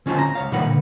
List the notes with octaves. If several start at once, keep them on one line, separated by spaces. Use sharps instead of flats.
D3 C#4 F4 C5 A5
A#5
C#2 C#5 F5
A#2 D#3 G3 A#3 B4 F#5
D3